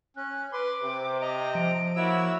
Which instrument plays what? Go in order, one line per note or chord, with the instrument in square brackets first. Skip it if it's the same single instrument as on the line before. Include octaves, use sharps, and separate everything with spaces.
[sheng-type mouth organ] C#4 [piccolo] F#6
[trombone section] B4 [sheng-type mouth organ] C6 [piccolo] D6
[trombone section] C3 [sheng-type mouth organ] C4
[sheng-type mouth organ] D#5 A#5
[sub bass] F3 [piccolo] D7
[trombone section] A#3 E4 [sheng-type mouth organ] F#4 C#5 E6